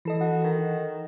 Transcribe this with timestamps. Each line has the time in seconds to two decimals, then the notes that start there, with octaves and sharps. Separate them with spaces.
0.05 E3 A4 D#5
0.20 F#4
0.44 D#3